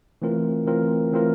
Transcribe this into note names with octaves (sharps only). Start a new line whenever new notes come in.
E3 A3 C4 F4 A#4
E3 A3 C4 F4 A#4
E3 A3 C4 F4 A#4